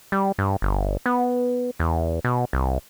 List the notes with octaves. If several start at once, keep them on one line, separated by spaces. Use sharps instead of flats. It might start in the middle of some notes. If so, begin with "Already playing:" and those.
G3
G2
G1
B3
E2
B2
C2